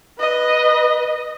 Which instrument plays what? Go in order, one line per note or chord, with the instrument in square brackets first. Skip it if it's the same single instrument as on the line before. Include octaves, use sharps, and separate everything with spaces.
[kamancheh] B4 D#5